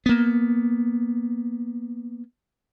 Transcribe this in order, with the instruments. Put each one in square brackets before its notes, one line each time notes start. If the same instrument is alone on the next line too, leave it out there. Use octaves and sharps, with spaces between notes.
[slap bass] A#3 B3